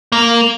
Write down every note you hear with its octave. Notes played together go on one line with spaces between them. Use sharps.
A#3